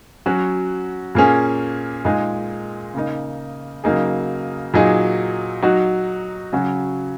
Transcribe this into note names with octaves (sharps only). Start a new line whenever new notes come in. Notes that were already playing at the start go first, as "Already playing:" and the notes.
F#3 C#4 F#4
A#2 A#3 C#4 G#4
A#2 G#3 D#4 G#4
C#3 A#3 D#4
C#3 F#3 A#3 D#4 G#4
A#2 F#3 D#4 G#4
F#3 D#4 F#4
C#3 F#3 C#4 F#4